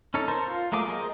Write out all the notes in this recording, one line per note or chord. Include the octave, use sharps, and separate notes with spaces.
C#4 D#4 A4 C#5
A#4 C5 A5
F4
F#3 A3 A#3 G#4 D6
G#4 A#4 C5 D#5